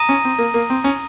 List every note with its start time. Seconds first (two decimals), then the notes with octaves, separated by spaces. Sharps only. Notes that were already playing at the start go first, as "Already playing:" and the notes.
Already playing: A#5 D#6 A#6 D#7
0.09 C#4
0.25 C4
0.38 A#3
0.54 A#3
0.70 C4
0.84 C#4